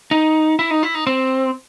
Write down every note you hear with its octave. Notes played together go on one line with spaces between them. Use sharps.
D#4
E4
D#4
E4
D#4
C4